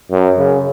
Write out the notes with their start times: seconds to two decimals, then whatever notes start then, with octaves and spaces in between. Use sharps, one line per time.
0.11 F#2
0.38 C#3